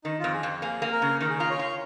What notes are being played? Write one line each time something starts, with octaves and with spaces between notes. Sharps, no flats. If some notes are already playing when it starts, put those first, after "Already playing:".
D#3 D#4
F2 F4
G#4
F2
A#3 G#4
A#3
A#4
C#3
D#3 A#4
G#4
F4 A#4
C#5
F4